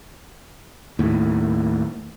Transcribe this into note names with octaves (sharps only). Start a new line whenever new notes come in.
D#2 A2